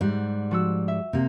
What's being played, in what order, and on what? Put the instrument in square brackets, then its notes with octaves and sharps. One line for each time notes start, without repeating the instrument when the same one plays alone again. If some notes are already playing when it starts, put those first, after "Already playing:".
[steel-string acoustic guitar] G#2 G3 F#5
[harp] F3 F#4 E6
E5
[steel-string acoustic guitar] C3 A#3